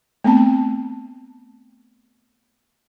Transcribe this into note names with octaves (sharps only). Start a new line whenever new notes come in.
A3 B3 C4 A5